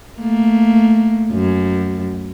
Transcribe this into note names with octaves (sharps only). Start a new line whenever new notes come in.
A3 A#3
F#2